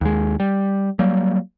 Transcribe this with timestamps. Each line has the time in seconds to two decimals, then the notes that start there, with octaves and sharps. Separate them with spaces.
0.01 D#2 G#3
0.40 G3
0.99 F#3 G3 A#3